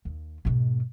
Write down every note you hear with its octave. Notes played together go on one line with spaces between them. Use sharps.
D#2
G#2 B2